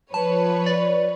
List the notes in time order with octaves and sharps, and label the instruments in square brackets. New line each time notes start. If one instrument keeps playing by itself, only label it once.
[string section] F3 B4 C#5 [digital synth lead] A5
[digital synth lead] D5